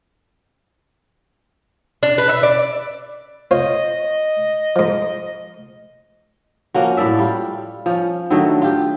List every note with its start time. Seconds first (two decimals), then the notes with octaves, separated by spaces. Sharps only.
2.03 D4
2.18 B4
2.29 E5
2.43 D5
3.51 F4 C5 C#5 D#5
4.76 G#2 F3
6.74 F3 A#3 C#4 F#4
6.97 A2 A4 D5 E5
7.19 G3 F4
7.86 F3 C#4
8.30 D3 D#3 F#3 A3
8.62 F4 G4